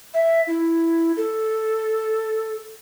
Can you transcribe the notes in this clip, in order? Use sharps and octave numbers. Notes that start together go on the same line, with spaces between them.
E5
E4
A4